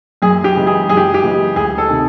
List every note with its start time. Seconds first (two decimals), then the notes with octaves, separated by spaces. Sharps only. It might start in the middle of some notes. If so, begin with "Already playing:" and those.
0.22 F#2 G#4
0.44 G4
0.56 C#3 E3 G#3
0.67 G#4
0.89 F#2 G#4
0.97 G4
1.14 G4
1.22 C#3 E3 G#3
1.56 D2 G#4
1.78 A4
1.89 C3 D#3